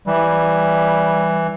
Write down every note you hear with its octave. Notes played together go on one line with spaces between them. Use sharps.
E3 G3